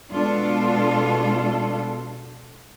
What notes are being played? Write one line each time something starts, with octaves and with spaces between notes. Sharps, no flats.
B2 G#3 D4 F4 A4